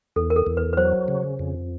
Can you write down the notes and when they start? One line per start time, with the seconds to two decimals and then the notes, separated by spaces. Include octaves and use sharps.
0.16 E2 A4
0.30 A#4
0.36 A4
0.46 E2
0.57 B4
0.73 B4
0.77 F#3 C5
1.08 C#3
1.39 F2